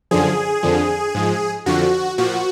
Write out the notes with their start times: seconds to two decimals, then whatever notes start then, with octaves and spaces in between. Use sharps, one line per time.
0.11 F#2 D3 F3 G#4
0.63 F2 D3 F3
1.15 G#2 F3
1.66 F2 D3 F3 F#4
2.18 A#2 F3 F#4